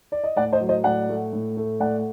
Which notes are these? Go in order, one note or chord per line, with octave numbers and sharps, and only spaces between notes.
D5
D#5
A2 D5 F#5
C5 D#5
F#3
C5 D#5
A2 D5 F#5
A3
A2
A3
A2 D5 F#5